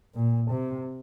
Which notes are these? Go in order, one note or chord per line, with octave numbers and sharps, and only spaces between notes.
A#2
C3